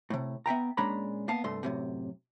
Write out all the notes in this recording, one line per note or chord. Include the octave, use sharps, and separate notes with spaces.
A2 C3
B3 E5 G5 A#5
A#2 G#3 C#4 D4 A#5 B5
A#3 B3 F5 A5
C2 G2 A3 C6
F#2 A2 C3